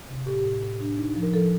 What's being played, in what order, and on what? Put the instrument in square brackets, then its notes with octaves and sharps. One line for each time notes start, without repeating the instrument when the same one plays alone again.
[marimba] C3
A2 G4
A2
A2
D4
D#4
F3
A#4
F3 A4